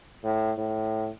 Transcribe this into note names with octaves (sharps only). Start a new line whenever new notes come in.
A2
A2